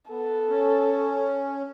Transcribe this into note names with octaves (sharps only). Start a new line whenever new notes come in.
B3 A4
C#4